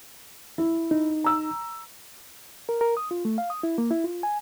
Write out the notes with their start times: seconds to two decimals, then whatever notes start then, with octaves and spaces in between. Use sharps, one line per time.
0.58 E4
0.91 D#4
1.24 A#5 E6
2.69 A#4
2.81 A#4
2.97 D#6
3.11 F4
3.25 A3
3.38 F5
3.50 D#6
3.63 E4
3.78 A#3
3.91 E4
4.04 F4
4.23 G#5